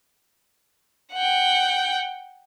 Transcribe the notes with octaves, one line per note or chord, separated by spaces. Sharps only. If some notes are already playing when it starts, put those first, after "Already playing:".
F#5 G5